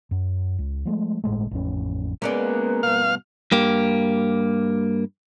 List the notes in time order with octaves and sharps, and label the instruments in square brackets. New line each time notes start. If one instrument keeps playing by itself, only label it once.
[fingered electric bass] F#2
C#2
F3 G#3 A3
G1 A2 G#3 A3
A1 F2 C#4
[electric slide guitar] G#3 C#4 G#4 [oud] A#3 B3 D5 [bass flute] B4
[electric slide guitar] G2 B2 [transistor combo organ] F5
[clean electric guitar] G2 A#3 G4